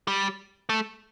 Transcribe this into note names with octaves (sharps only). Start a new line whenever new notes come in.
G3
A3